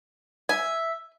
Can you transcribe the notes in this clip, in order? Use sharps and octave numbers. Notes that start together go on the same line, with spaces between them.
E5 G#5